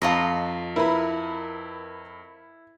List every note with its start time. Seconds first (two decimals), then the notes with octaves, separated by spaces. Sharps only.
0.02 F2 F4 D#5 A5 A#5
0.76 E4 A#4 B4 B5